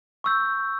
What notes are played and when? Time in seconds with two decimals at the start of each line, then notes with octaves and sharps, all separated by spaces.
0.24 C#6 E6 G6